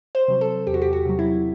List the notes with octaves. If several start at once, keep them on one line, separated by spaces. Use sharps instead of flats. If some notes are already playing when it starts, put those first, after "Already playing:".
C5
C3 F#3
A4
E2 G4
F#4
G4
F#4
C3 F#3
E4